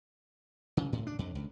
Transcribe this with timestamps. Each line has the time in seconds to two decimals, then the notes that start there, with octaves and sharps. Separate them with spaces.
0.77 C#3
0.92 A2
1.07 D4
1.19 F2
1.35 C#2